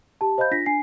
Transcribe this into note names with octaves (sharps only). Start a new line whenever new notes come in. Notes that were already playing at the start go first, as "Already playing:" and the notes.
G4 A5
C5 D#5 F5 B5 G6
D4 F4 A#6 B6
D4 G#5 C7